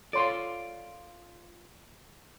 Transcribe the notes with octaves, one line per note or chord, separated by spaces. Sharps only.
F4 A4 C#5 D5 C6